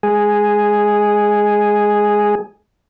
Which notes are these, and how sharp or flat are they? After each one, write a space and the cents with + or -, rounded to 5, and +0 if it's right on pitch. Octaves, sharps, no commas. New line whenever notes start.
G#3 +0 G#4 +0